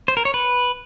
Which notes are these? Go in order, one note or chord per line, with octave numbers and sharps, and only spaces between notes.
C5
A#4
C#5
B4